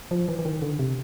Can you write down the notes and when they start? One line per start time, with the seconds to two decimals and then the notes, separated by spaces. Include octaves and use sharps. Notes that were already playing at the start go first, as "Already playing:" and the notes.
0.11 F3
0.28 E3
0.39 E3
0.45 D#3
0.62 D3
0.79 C3